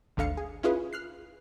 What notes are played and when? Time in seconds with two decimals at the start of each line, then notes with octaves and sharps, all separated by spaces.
0.17 G#1 D2 D3 F5 C#7
0.37 G#4
0.63 C#4 E4 F4 G#4 B4
0.93 F6 F#6 C7